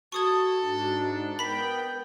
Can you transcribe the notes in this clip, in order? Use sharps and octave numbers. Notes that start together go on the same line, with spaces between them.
F#4 A4 C#6 D#6 G#6
G#2 D4
B3 A#4 G5 B5 B6